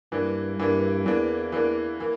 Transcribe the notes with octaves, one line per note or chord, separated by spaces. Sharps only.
G2 E3 A#3 D4
G2 E3 A#3 D4
E2 E3 A#3 D4
E3 A#3 D4
E3 A#3